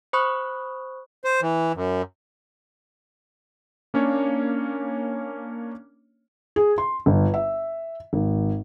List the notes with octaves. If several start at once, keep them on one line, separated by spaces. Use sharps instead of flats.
C5 B5 C#6 D#6 F#6
C5
E3
F#2
A#3 C#4 D4 C#5
G#4
C6
G1
E5
G#1